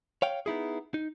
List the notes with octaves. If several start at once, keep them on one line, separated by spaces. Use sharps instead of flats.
C#5 F5 G5
B3 D#4 E4 G#4
D#4